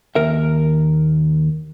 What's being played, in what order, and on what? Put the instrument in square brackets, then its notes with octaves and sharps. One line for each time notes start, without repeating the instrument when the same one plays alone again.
[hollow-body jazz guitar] D#2 A#4 E5